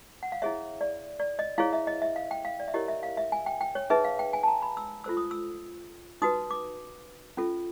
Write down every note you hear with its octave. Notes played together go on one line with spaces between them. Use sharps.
F#5
F5
E4 G#4 C#5 E5
D5
D5
D#5
E4 G#4 C#5 F5
E5
D#5
E5
F5
G5
F5
D5
E5
E4 G4 A#4 C#5 D#5
E5
F5
E5
G#5
G5
G5
C#5
D#4 G#4 B4 E5
F5
G5
G#5
A5
A#5
B5
E6
F4 A4 C5 E6
D#6
E6
D#4 F#4 B4 D#6
D6
C#4 F4 A4